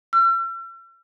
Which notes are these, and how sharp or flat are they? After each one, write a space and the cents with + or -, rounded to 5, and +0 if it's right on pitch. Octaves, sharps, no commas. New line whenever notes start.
E6 +45